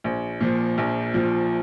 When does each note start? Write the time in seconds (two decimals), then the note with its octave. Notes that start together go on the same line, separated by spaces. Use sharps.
0.04 A#1
0.40 A#2 F3
0.78 A#1
1.14 A#2 F3